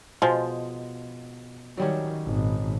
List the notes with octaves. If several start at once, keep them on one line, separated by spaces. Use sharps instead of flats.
B2 F3 G#3
D#3 F#3 G3 C#4
G#1 A#2